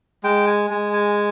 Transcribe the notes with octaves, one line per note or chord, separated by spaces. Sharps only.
G#3 G5
G#5
G#3 G#5
G#5